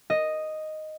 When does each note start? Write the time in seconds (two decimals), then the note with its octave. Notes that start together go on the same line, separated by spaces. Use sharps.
0.10 D#5